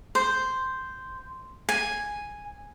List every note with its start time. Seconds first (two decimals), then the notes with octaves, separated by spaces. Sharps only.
0.15 C5
1.69 G#5